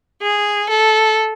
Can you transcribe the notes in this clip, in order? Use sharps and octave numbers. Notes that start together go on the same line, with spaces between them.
G#4
A4